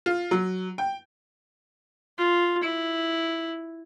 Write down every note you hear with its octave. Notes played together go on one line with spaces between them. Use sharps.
F4
F#3
G5
F4
E4